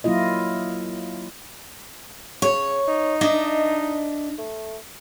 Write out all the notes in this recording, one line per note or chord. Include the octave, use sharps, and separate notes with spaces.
F#3 A#3 E4 F4 D#5
C#3 C#5
D#4
D4 D#5 E5
A3